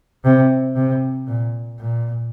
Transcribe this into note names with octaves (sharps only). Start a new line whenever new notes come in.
C3
C3
A#2
A#2